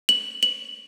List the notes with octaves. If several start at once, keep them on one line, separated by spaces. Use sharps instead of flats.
F#7
F#7